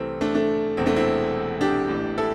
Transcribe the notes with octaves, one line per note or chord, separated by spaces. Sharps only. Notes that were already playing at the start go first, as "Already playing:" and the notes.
Already playing: C2 C3 E3 A3 C4
A3 D4
A3 D4
E1 E2 C3 E3 C4
A3 D4
C4 E4
D4 G4
A1 A2 E3
E4 A4